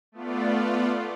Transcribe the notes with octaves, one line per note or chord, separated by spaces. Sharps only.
A3 B3 F4 D5